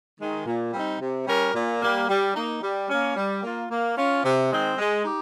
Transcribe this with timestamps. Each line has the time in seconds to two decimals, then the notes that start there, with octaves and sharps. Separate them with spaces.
0.19 D#3 G#3
0.46 A#2
0.73 G3 C4 D#4
1.00 C3
1.26 G3 C#4 G4 A#4
1.54 A#2
1.81 G3 A#3
2.08 G3
2.34 A#3 D#4
2.62 G3
2.88 A#3 C#4
3.16 G3
3.43 A#3 F4
3.70 A#3
3.96 C#4 F4
4.23 C3
4.51 D#3 G#3 C4
4.78 G#3
5.04 D#4 G4